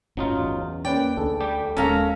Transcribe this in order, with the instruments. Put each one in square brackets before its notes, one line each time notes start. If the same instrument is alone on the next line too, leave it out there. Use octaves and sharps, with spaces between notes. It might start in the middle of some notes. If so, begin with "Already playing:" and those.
[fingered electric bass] G1 A2 [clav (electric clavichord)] F#3 D#4 F4 [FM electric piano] C#4
[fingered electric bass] E2
[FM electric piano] A#3 C#4 [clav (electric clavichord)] B4 D5 [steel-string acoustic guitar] G5
[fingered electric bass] D2 [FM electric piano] D3 G#4 A4
[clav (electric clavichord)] G3 G4
[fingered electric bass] D#1 G#3 [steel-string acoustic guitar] C#4 A#5 [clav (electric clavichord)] A4 A#4 F5